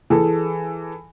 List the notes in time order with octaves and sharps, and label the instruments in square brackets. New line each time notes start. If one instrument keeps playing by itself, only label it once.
[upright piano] E3 G#4 A4